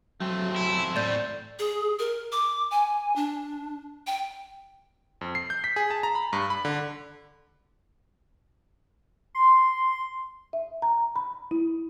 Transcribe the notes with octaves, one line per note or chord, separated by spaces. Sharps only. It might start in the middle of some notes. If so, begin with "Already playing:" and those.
F#3 A3 C4
E4
A2 D5 G6
G#4
A#4
D6
G#5
D4
G5
F2
C7
G6
B6
G#4
A5
A#5
B5
G2
B5
D3
C6
E5
A#5
B5
E4